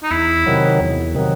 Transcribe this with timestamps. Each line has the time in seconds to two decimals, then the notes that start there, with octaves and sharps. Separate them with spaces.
0.03 D#4
0.11 E2 E4
0.46 C3 D#3 F#3
0.80 E2
1.15 C3 D#3 F#3